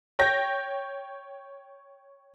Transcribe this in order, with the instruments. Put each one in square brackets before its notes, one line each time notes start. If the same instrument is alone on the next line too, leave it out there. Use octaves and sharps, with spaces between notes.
[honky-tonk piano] C#5 G5 G6 A#6